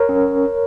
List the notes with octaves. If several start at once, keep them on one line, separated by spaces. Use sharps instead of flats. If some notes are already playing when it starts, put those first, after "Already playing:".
Already playing: A#4 C#5
C#4